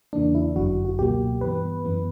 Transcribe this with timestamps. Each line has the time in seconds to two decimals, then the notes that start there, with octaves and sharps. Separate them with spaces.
0.13 E2 C#3 E3 A#3 D4
0.35 E4
0.56 G1 F#2 D3 F#3 F#4
0.85 F#4
0.99 C#2 B2 F#3 A#3 G4
1.41 G2 E3 B3 B4
1.85 F#2 E3 B3